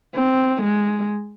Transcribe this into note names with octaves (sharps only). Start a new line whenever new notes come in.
C4
G#3